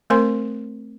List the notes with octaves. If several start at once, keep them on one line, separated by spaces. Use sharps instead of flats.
A3 C4 A#4 C5 G#5 C6